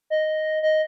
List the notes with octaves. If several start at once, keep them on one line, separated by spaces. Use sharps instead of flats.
D#5
D#5